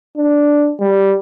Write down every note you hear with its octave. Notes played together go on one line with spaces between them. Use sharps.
D4
G3